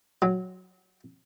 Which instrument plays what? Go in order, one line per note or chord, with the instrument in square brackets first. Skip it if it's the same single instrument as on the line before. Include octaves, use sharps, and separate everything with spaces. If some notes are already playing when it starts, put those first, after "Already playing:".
[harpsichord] F#3